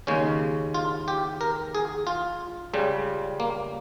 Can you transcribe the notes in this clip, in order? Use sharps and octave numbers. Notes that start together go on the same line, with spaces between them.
D#2 C#3 G#3 C#4
F4
G4
A#4
G#4
F4
C#2 C#3 G3
A#3